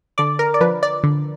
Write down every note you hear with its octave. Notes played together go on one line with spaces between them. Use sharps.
D3 D5
A#4
D5
F3 B4
D5
D3